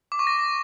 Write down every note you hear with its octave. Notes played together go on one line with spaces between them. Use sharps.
D6
C#6
A#6